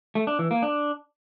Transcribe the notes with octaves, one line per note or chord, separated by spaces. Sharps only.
A3
D4
E3
A#3
D4